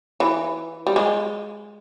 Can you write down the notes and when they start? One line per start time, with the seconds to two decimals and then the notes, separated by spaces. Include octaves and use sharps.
0.20 E3
0.87 G3
0.96 G#3